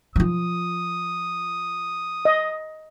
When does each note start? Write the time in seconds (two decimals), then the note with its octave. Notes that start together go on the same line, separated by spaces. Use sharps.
0.16 F3 F4 D#6
2.25 D#5